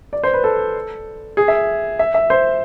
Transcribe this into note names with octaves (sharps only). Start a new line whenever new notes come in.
D5
C5
B4
A4
G#4
E5
E5
E5
C5